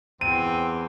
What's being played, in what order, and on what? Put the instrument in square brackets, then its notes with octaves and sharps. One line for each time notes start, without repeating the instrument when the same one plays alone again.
[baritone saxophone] E2 [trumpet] C4 [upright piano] D#7